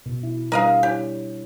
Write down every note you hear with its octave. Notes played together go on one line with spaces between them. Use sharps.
B2
E4
G3 D4 A#4 D#5 F5
E4 G4 C#5